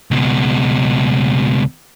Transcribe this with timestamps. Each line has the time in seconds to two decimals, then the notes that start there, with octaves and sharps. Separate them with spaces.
0.11 C#2 B2